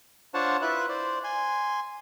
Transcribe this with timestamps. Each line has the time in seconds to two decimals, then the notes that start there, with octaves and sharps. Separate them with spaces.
0.34 D4 F4 C5 C#5 F#5 A5
0.62 E4 F4 B4 E5 F#6
0.89 C5 D5
1.24 G#5 C6